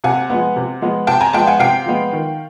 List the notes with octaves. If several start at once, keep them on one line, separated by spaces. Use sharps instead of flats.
C3 F#5 G#5
F3 G#3 B3
C3
F3 G#3 B3
C3 G5 A5
G#5 A#5
F3 G#3 B3 G5 A5
F#5 G#5
C3 F5 G5
F3 G#3 B3
D#3